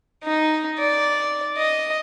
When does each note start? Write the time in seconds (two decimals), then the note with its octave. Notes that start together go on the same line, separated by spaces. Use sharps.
0.24 D#4
0.79 D5
1.57 D#5